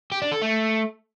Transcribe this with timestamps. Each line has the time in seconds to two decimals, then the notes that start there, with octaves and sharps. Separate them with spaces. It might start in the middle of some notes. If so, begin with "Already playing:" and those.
0.12 G4
0.22 D4
0.32 A4
0.42 A3